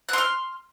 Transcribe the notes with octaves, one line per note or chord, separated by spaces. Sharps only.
C6 F6 F#6